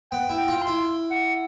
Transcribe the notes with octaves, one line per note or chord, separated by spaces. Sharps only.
B3 G5
E4
G5
F4
C6
E4
F#5